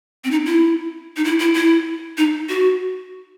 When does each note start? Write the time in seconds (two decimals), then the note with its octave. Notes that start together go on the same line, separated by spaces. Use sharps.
0.24 C4
0.31 D#4
0.46 E4
1.16 D#4
1.24 E4
1.40 E4
1.55 E4
2.17 D#4
2.49 F#4